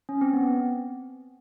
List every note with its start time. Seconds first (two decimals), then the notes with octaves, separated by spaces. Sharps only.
0.09 C#4
0.21 C4
0.33 B3